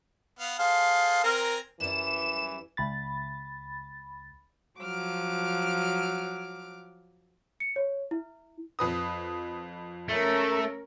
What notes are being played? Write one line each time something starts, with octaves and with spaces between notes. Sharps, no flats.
B3 F5
G#4 A4 C5 F5
C4 A#4 G#5 A#5
F#2 E3 G3 E7
C#2 B5 A6
F3 F#3 D6 F6
C#7
C#5
E4
F2 B4 D#6
A3 C#4 A#4